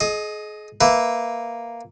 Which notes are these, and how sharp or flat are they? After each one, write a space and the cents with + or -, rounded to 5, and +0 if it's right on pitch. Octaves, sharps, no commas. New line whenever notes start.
G#4 +35 D#5 +0
A#3 +0 B4 +0 E5 +0